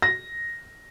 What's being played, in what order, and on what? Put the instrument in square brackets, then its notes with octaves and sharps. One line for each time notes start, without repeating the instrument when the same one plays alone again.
[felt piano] A#6